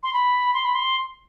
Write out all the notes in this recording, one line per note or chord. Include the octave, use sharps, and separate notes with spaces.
C6
B5
C6
B5
C6